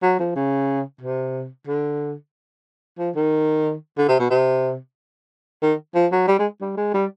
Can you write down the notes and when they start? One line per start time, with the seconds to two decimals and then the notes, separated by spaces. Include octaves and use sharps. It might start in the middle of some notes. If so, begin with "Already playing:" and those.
0.03 F#3
0.19 F3
0.36 C#3
1.01 C3
1.68 D3
2.99 F3
3.16 D#3
3.98 D3
4.08 C3
4.20 B2
4.31 C3
5.62 D#3
5.95 F3
6.12 F#3
6.28 G3
6.39 G#3
6.61 G3
6.77 G#3
6.94 G3